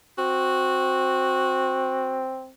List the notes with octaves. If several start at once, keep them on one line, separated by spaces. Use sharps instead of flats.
C4 F#4